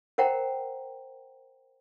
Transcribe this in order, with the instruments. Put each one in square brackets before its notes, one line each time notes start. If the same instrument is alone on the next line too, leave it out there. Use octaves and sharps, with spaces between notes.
[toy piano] A#4 C5 F#5 G5 A#5